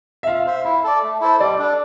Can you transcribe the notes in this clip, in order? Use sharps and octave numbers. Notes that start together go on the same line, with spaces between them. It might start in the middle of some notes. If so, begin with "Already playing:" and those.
E5
F4 F5
C5 E5 F5
E4 E5
A4 D5
A3
E4 A4 C5
G3 D5
D4 A4